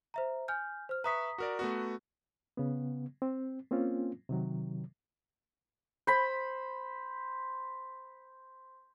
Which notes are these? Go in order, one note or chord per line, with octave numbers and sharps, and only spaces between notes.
C5 E5 A#5
G#5 F6 G6
C5 F6
B4 E5 A#5 C#6 D#6 B6
F#4 A#4 D5
A3 B3 F#4
C#3 B3
C4
A#3 C4 C#4 F4
C3 D#3 F#3
C5 B5